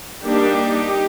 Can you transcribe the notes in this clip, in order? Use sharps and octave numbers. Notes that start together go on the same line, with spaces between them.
G3 A#3 D4 D#4 G4